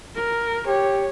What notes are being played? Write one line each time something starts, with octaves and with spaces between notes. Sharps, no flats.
A#4
G4 C#5